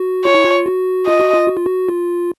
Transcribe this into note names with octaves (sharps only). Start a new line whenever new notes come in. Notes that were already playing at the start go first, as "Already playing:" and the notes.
Already playing: F#4
F4 C#5
E4
F4
F#4
F4 D#5
F#4
F4
F#4
F4
F#4
F4